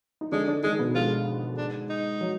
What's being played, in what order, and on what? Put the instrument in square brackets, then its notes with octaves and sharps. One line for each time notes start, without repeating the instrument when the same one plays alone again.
[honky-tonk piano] D#4
[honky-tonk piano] D3 D4 [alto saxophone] G#3
[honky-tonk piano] D3 D4
[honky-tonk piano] D#3 D#4 [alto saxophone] G#3
[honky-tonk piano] B2 B3
[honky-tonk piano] G#2 G#3 [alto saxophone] F4
[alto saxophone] D4
D#4
[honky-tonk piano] F#3